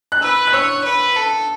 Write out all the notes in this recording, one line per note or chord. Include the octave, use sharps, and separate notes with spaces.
F#6
B4 E6
F#6
C#5 E6
B4
A4